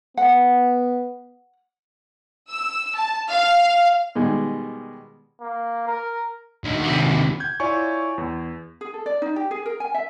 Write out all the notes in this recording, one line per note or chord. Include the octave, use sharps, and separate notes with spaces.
B3 F#5
E6
A5
F5
B2 D#3 G3 G#3
A#3
A#4
D2 D#3
D#2 C3
G6 G#6
E4 F4 C#5 D5 G#5 C#6
E2
G#4
A4
D5
D#4
G4
G#4
A#4
G#5
E5